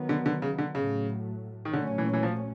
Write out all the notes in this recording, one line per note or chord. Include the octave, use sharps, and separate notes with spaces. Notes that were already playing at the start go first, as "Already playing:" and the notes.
Already playing: D#3 F#3 B3
D3
D3
C#3
D3
A2 C#3 F#3 A3
D#3
A#2 D3 F#3 A3 C#4
E3
E3
F3